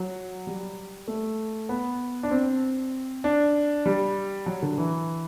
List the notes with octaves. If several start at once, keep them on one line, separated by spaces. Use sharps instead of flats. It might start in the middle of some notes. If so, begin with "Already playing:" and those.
Already playing: F#3
G3
A3
B3
D4
C4
D4
G3
F#3
D3
E3